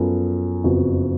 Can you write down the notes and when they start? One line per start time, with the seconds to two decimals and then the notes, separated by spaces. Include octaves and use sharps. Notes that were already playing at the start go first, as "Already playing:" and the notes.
Already playing: F#2 F3 B3 F4 A4
0.64 F#1 F2 F3 B3 F#4